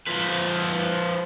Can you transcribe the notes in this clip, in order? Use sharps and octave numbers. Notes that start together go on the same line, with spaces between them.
F3 B4